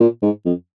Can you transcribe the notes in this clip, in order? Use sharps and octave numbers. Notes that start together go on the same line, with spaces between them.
A#2
G#2
F2